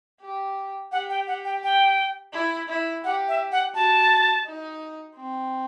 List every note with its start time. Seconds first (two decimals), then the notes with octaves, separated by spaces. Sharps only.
0.21 G4
0.92 G4 F#5
1.10 G5
1.27 F#5
1.45 G5
1.63 G5
2.33 E4
2.68 E4
3.04 G4 F#5
3.28 E5
3.52 F#5
3.75 F#4 A5
4.46 D#4
5.16 C4